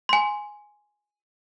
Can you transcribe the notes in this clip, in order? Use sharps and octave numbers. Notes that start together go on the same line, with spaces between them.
G#5 C6